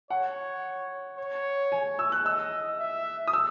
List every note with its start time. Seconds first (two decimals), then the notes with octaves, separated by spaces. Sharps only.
0.10 C#5 F#5
1.18 C#5
1.72 G#5
1.99 E6
2.12 F#6
2.25 D#5 E6
2.80 E5
3.27 D#6
3.33 E6